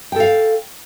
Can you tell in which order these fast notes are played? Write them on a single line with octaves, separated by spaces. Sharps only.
G5 A4 F5